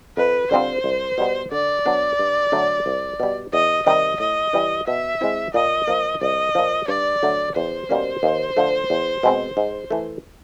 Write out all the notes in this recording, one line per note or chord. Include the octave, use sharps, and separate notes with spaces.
F2 B4
D3 G3 C4 F4 C5
C2
B2 G3 B3
D3 D5
F#3 B3 D4
G2
D3 F#3 A3
C2
B2 G3
E2 D#5
C3 D#3 G3 D#5
A2 D#5
E3 G3
B2 E5
G#3 C4 E4
A#2 D#5
F3 A#3
C2 D#5
A#2 F3
G2 D5
D3 F#3 A3
E2 C5
B2 G3 A#3 C#4
D#2
D3 F3 A3
E2
B2 G#3 C4
G#2
E3 A3